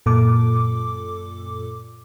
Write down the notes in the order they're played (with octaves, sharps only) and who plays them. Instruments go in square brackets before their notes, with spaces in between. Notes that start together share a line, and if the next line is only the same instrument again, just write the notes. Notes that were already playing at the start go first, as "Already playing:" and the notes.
[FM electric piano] F#2 A#2 A4 D6